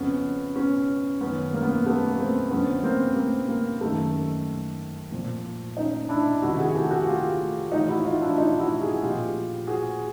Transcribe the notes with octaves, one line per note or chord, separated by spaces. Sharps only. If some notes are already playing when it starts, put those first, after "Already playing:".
Already playing: F2 C#3 F3 B3 C#4
B3 C#4
F#2 D#3 B3 C#4
A#3
B3
A#3
A3 B3
A#3 C4
F2 D3 F3 B3 C#4
A#3 C4
A#3
A#3
F#2 D#3 A3
A#2 F3
C#4 D#4
D4 E4
F2 C3 D#3 E4 F#4
F#4 G#4
G4 A4
F#4 G#4
F4 G4
A2 E3 D#4 F4
E4 F#4
D#4 F4
D4 E4
D#4 F4
E4 F#4
F#4 G#4
A#2 F3 F4 G4
F#4 G#4